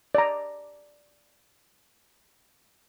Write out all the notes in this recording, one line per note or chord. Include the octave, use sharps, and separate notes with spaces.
D5 A#5